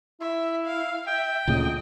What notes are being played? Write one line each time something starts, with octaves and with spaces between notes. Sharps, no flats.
E4 E5
F5
E5 G5
D2 A#2 C#3 D#5